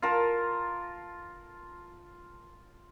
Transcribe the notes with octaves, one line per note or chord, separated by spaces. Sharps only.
F4 A#4 A5